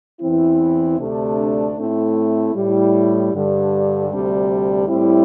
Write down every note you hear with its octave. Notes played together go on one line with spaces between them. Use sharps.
E2 E3 C4 E4
D2 C3 A3 D4
A2 A3 C4 E4
A2 G3 E4
G2 D3 G3
D2 C3 G3 D4
A2 G3 C4 E4